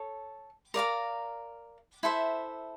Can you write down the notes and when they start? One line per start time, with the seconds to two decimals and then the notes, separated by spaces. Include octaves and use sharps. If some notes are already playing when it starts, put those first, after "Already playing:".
Already playing: A4 C#5
0.74 A#4 D5 F5 A#5
2.03 E4 A4 C5 E5